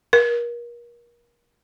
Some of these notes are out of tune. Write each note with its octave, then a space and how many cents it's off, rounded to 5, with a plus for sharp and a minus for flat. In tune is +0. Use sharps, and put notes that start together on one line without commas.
A#4 +35